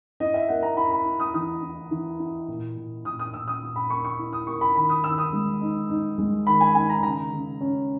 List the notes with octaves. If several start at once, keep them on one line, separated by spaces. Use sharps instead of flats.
E4 D#5
E5
A#3 F#5
A#5
E4 B5
B5
E4
D#6
E3 D#6
E4
E3
E4
A#2
A#2
A#2 D#6
D#6
A#2 E6
D#6
A#2
B5
A#3 C#6
C#6
E4
D#6
A#3 C#6
B5
D#3 B5
D#6
D#3 E6
D#6
G#3
D#4
D#4
G#3
D#3 B5
G#5
D#4 G#5
A#5
C#3 A#5
C#3
C#4